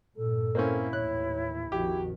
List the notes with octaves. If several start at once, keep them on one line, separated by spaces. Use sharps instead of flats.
G2 A#2 A4
A#3 C4 C#4 E4
D#2 A2 E3 C#5 F#6
A#1 F2 D#3 F#4 G4